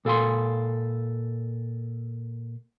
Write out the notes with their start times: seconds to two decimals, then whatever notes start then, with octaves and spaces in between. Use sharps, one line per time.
0.05 A#2 A4 F5 G#5 C6